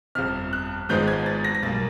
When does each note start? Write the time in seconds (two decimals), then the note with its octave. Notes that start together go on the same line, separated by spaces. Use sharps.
0.15 G1 F2 C3 F6
0.53 F#6
0.89 G#1 G#2 F3 G#3 B3 G6
1.08 G#6
1.26 A6
1.44 A#6
1.55 A#6
1.63 B1 B2 G3 A#3 A6